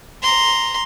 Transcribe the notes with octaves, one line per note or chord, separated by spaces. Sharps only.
A#5 C6